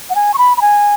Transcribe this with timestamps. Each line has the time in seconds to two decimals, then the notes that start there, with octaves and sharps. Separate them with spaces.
0.10 F#5
0.15 G#5
0.34 C#6
0.38 B5
0.57 B5
0.61 G#5